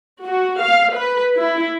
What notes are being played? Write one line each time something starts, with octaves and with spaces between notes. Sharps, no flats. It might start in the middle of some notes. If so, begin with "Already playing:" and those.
F#4
F5
B4
E4